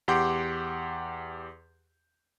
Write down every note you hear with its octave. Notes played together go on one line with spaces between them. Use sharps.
E2 G4 F#5 C6 D6 G6